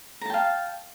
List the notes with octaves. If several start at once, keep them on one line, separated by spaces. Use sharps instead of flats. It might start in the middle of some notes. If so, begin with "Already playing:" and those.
F5 G5 A5 A#5